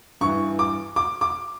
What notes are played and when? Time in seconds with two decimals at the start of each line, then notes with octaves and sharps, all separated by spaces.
0.21 G2 E3 C#6
0.59 D6
0.96 D6
1.21 D6